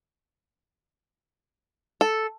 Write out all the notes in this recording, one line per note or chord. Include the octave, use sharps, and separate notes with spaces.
A4